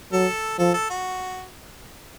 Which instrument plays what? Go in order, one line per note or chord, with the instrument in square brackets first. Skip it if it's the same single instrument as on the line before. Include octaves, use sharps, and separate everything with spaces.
[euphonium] F#3 [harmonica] A4
[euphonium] F3 [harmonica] A4
[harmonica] A4
F#4